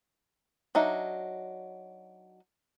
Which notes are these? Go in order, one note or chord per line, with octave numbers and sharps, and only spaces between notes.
F#3 D4 D#4 E5